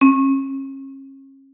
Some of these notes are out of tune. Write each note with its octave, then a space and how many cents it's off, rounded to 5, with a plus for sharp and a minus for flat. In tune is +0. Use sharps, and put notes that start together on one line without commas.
C#4 -40